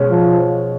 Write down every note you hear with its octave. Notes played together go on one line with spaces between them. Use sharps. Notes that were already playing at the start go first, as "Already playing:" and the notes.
Already playing: B2 G#3 C#4
F3